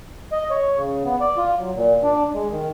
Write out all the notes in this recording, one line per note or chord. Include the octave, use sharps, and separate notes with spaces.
D#5
C#5
C#3
B3
D5
F4
F#3
A#2
D4
G#3
D#3